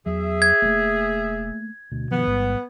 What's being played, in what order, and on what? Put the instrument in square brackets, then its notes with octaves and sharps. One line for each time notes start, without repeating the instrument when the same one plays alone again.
[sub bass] E2 [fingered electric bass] F#3 [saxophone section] G#4 E5
[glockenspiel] G#6
[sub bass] E1 [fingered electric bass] A3 A#3
[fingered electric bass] D2 [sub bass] B2
[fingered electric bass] G2 D#3 F3 [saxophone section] B3
[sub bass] A1 [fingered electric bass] G#2 G3